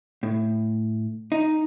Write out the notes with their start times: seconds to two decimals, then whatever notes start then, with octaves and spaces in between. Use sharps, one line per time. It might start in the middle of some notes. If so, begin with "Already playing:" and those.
0.23 A2
1.32 D#4